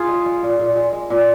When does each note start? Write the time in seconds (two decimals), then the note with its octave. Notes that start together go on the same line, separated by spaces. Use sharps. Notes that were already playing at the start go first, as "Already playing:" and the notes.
Already playing: F4 G#4
0.09 G#3
0.26 G#3
0.43 A#2
0.59 A#2
0.76 G#3
0.93 G#3
1.10 A#2